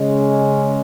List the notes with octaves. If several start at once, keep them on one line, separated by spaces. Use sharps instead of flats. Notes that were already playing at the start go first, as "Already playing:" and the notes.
Already playing: C#3 G#3 C#4